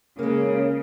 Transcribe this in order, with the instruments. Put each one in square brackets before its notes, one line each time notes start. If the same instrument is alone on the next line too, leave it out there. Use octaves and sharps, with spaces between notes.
[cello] C#3 [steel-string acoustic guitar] G#3 A#3